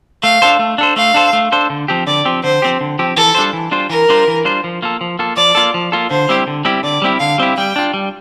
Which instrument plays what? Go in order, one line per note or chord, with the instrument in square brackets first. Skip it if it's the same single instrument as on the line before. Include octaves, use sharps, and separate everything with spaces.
[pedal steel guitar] A3 [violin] F5
[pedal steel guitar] D4 A4 C5
A3
D4 A4 C5
[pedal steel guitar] A3 [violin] F5
[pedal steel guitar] D4 A4 C5
A3
D4 A4 C5
D3
F3 C4 G4
[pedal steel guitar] D3 [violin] D5
[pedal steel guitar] F3 C4 G4
[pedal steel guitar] D3 [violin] C5
[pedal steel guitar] F3 C4 G4
D3
F3 C4 G4
[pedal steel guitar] E3 [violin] A4
[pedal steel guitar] G3 D4 F4 C5
E3
G3 D4 F4 C5
[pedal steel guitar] E3 [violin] A#4
[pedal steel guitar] G3 D4 F4 C5
E3
G3 D4 F4 C5
F3
A#3 F4 A4
F3
A#3 F4 A4
[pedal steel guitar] F3 [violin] D5
[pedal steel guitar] A#3 F4 A4
F3
A#3 F4 A4
[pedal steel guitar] D3 [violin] C5
[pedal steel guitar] G3 C4 E4 G4
D3
G3 C4 E4 G4
[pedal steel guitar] D3 [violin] D5
[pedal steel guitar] G3 C4 E4 G4
[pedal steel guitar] D3 [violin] F5
[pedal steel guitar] G3 C4 E4 G4
[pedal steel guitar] G3 [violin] G5
[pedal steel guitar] D4 F4
G3